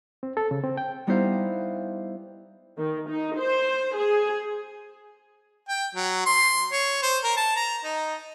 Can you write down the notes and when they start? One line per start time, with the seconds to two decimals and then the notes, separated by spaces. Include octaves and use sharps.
0.23 C4
0.37 A4
0.51 C#3
0.64 C4
0.77 G5
1.07 G3 B3 D#4 E4 C5 F5
2.78 D#3
3.09 D#4
3.39 C5
3.96 G#4
5.69 G5
5.95 F#3
6.26 C6
6.72 C#5
7.03 C5
7.24 A#4
7.37 A5
7.56 A#5
7.84 D#4